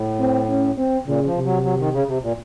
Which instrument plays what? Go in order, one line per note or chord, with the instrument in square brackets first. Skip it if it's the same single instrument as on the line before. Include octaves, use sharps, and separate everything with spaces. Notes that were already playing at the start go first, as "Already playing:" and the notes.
Already playing: [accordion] A2
[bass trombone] C4
C#4
C4
[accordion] A#2 [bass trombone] C#3
[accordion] F3
[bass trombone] C3
[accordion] F#3
F#3
D#3
C#3
C3
A#2